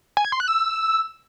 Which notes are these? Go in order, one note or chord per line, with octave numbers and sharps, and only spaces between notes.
G#5
G#6
C6
F#6
E6